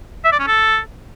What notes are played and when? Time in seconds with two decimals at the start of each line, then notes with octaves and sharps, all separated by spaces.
0.25 E5
0.32 D5
0.40 C#4
0.47 A4